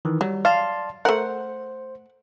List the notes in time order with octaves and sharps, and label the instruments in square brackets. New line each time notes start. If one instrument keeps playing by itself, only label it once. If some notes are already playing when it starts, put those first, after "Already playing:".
[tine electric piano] D#3 E3
[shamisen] F#3 [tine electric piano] G3
[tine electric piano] D5 A5 C6 [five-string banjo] F5
[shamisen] A3 A#4 [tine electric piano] C5 [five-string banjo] F#5